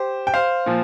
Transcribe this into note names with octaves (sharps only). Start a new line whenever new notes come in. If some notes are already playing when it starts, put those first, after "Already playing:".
Already playing: G4 C5
G5
C5 F5
A#2 F3